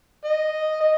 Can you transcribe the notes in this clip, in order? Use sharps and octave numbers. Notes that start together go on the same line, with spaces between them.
D#5
D#5